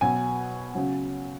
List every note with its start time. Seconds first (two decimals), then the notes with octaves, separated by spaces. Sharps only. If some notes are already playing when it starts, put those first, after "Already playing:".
0.01 B2 F#3 G#5
0.75 C#3 F#3